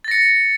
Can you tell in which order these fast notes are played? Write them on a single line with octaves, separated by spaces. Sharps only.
A6 A#6 C#7